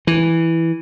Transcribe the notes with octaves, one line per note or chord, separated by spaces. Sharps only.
E3